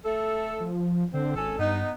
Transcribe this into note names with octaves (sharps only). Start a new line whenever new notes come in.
A3 A4
F3
D3 C4
G#1 C#4 A4
G2 B3 D#4